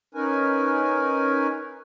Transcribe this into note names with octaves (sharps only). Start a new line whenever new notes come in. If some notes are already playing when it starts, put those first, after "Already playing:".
C#4 D#4 A#4 B4 G#5